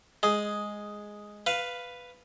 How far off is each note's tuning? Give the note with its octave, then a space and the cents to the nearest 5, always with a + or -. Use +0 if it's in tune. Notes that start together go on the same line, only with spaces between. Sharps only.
G#3 +0 G#4 +5
B4 +5 F5 +0